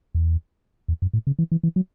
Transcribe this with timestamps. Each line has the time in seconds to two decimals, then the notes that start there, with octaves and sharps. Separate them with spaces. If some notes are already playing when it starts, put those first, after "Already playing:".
0.15 E2
0.88 E2
1.02 F#2
1.13 A2
1.27 C#3
1.39 E3
1.52 E3
1.63 E3
1.76 F#3